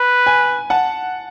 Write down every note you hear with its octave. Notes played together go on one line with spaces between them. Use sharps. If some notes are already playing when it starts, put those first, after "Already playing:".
Already playing: B4
G#5
F#5 A5